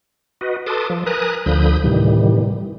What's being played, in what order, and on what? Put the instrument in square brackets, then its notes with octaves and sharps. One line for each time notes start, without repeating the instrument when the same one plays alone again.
[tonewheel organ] F#4 B4 D#5
A4 B4 A5 C6 D6 D#6
F3
A#4 B4 G#5 A#5 D#6 F#6
D2 D3 F3 B5 D#6 G6
A2 C3 D#3 E3 G3